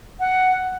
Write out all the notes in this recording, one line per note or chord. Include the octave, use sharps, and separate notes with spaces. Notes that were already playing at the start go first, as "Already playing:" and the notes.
F#5